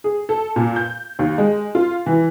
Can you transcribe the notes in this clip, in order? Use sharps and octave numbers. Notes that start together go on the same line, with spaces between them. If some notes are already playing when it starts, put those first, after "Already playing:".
G#4
A4
A#2
G6
D#2
G#3
F4
E3